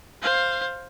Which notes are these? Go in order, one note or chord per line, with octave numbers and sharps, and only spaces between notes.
C5 F5